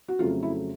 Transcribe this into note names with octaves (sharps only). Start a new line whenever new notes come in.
F#4
F2 C#3 F#3 A3 F4
E4